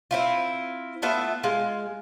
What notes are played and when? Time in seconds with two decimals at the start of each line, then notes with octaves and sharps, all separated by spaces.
0.11 C4 E4 F4
1.02 A3 B3 F4 E5
1.43 G#3 F4